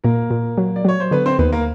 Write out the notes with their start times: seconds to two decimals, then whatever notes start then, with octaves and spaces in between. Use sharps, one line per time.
0.04 A#2 A#3 A#4
0.31 A#2
0.58 F#3
0.76 D5
0.85 F#3 C#5
1.00 C5
1.11 D3 B3 B4
1.26 C4 C5
1.39 D#2 B3 B4
1.53 A#3 A#4